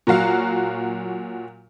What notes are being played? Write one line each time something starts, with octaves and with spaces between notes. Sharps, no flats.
A#2 F#3 F#4 F5